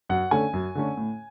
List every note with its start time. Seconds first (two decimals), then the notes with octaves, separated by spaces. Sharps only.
0.10 F#2 F#5
0.31 D3 A3 C#4 G#5
0.53 F#2
0.75 D3 A3 C#4
0.97 A2